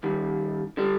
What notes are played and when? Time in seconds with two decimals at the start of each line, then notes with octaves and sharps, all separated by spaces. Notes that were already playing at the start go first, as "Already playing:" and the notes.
0.03 D#2 D#3 G3
0.77 D3 G3